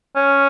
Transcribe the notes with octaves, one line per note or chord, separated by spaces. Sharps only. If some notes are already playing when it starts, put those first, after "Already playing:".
C#4